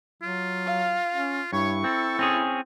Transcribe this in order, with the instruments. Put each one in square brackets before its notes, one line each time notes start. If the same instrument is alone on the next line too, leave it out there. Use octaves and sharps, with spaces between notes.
[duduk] F#3 [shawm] F4
[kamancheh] F5
[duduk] C#4
[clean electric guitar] G2 [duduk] E4 [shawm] C#5 [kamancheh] C#6
[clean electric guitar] C4 [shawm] A4
[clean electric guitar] C4 C#4 G#4